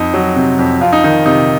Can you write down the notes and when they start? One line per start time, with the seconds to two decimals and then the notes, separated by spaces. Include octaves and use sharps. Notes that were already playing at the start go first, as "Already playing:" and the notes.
Already playing: F2 D#4
0.14 F#3
0.36 C3
0.59 F2
0.81 F2 F4
0.93 D#4
1.04 D#3 D#4
1.26 C3 D#4